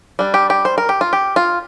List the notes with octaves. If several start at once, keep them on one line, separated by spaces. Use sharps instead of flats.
G3 D4
G4
G4
C5
A#4
G4
F4
G4
F4